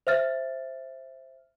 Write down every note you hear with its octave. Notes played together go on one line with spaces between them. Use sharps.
C5 E5 F6 A6